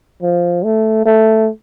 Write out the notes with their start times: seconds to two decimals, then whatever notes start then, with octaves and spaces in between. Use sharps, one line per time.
0.22 F3
0.64 A3
1.06 A3